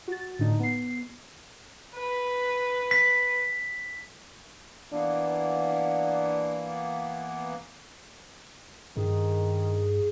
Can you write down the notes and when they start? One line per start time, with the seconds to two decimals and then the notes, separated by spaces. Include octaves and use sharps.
0.08 F#4 A6
0.39 A2 D3 D#4
0.59 B3 C7
1.96 B4
2.91 B6
4.92 E3 A#3 B3 D4
8.97 G2 D#3 G#4